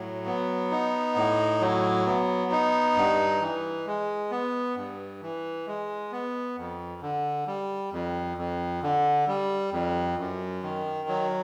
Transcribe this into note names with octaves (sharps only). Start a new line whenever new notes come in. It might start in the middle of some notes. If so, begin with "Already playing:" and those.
Already playing: A2 F#3
B3
D#4
A2
F#3
B3
D#4
G2
E3
G#3
B3
G2
E3
G#3
B3
F2
D3
G3
F2
F2
D3
G3
F2
F#2
D#3
F#3